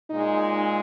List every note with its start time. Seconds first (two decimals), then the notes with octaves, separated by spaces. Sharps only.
0.10 A#2 G#3 D#4